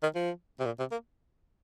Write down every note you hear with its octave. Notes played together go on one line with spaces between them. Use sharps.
D#3
F3
C3
A#2
C3
A#3